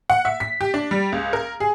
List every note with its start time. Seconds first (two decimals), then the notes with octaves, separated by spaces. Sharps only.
0.10 F#5
0.25 E5
0.40 B6
0.61 G4
0.74 D4
0.91 G3
1.12 C#2
1.33 A#4
1.60 G#4